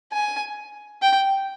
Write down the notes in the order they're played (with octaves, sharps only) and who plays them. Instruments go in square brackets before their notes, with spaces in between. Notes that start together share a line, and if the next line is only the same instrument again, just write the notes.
[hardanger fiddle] G#5
G5